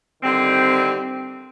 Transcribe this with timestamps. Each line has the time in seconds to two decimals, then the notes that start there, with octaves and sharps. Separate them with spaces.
0.23 D3 D#3 G3 C4